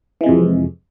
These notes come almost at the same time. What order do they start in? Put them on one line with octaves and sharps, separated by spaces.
E3 G#3 C3 F2